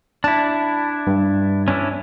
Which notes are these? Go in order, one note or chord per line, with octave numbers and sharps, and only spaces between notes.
D4 E4 A5
G2
C#4 D4 E4